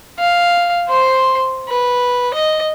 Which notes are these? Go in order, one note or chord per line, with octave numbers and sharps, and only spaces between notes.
F5
C5 C6
B4
D#5